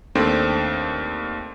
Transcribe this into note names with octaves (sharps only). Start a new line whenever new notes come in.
D#2 A3 C4 D4